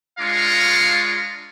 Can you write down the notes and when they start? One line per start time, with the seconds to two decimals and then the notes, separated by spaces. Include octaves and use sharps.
0.19 G#3 D4 F4 F5 A#5 C#6